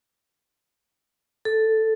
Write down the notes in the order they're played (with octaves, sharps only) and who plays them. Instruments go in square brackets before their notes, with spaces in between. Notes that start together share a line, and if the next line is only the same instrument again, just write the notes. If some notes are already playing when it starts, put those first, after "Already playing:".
[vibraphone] A4